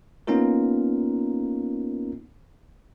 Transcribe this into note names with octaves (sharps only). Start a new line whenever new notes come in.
A#3 B3 C#4 D#4 F4 A#4